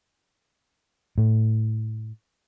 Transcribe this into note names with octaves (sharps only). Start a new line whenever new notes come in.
A2